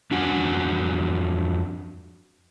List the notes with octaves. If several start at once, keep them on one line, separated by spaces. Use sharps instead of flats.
F2 D4 F#4 F#5 G#5